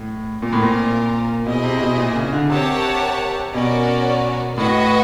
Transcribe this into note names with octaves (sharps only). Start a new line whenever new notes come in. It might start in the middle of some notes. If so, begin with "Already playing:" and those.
Already playing: A2
A#2 C4 F4 A#4
A2
A#2
B2 E4 G#4 C5 D#5
C3
C3
B2
A#2
C#3
D3
C3 G4 A#4 C#5 F#5 A5
B2 C#4 F#4 A#4 D5
A2 F#4 B4 D#5 F#5